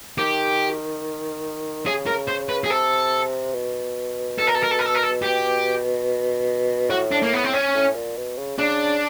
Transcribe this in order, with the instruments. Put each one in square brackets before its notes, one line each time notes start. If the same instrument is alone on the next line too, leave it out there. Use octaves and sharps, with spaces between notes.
[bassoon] D#3 [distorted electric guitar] G4
[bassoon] C#3 [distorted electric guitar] G#4
[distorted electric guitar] A#4
C5
B4
G#4
[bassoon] C3 [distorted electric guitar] A4
[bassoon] B2
[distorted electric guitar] A4
A#4
A4
A#4
A4
A#4
A4
A#4
A4
G4
[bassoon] A2 [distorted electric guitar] F#4
[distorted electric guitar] D4
A#3
B3
C4
C#4
[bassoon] A2
A#2
B2
C#3
[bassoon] C#3 [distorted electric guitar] D4